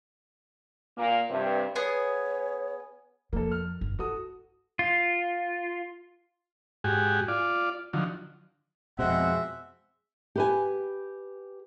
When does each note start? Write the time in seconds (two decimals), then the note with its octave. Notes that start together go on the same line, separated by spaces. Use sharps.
0.97 A#2 A#3
1.29 G2 C3
1.76 B3 G#4 C#5
3.33 F2 F3 A#3 A4
3.51 F6
3.81 G1 F2
3.99 E4 F#4 A4 D#6
4.79 F4
6.84 G#2 F#4 G4 G#5
7.28 F4 D5
7.93 D3 D#3 F3 F#3
8.99 F2 B2 G#3 C4 E5 F#5
10.36 G4 B4 G#5